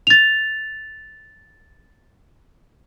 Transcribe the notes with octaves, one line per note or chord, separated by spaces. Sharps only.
A6 F7